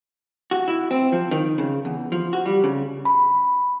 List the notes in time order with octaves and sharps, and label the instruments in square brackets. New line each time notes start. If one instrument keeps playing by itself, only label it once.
[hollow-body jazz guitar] F#4
E4
C4
F3
D#3
C#3
E2
F3
F#4
G3
C#3
[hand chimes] B5